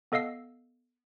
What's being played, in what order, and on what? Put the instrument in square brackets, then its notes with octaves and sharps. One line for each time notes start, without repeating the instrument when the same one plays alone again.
[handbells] B3 A4 D#5 F5 E6 C7